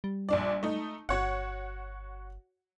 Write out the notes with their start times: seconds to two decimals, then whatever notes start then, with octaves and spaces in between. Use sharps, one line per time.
0.04 G3
0.29 A#1 D4 D5
0.63 A3 D#4
1.09 G1 F#4 C#5 F#5